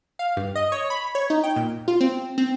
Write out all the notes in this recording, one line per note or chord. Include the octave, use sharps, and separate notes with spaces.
F5
G2
D#5
C#5
B5
C#5
D#4
G5
A#2
F4
C4
C4